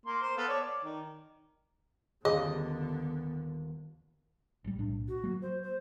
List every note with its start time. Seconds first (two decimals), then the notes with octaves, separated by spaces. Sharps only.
0.06 A#3 C6
0.22 C5
0.37 B3 A4 F5
0.48 C#5 D5 A5
0.61 D5
0.84 D#3
2.25 D#1 D3 B3 G#4 D#5
4.65 A1 G3
4.79 B1 A2 D4
5.08 F#4
5.24 F#3 A#3
5.42 C5
5.63 C5